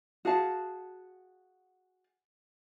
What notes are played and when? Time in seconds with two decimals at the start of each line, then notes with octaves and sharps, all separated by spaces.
0.25 F#4 G#4 F5 A5